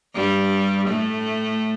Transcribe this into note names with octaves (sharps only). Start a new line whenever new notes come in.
G2 G3
A2 A3